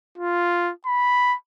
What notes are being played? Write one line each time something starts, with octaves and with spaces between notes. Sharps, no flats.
F4
B5